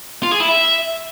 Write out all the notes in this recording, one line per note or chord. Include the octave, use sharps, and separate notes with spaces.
F4
G#4
E4
E5